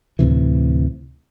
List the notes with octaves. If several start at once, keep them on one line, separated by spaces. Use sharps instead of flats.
D2 A2 C3 E3